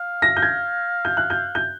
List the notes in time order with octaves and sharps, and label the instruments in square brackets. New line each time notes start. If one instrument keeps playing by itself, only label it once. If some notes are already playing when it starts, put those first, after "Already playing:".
Already playing: [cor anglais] F5
[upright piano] A#6
G6
G#6
G6
F#6
G6
G6